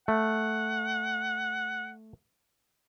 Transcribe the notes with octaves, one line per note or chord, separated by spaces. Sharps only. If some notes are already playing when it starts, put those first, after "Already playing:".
A3 F#5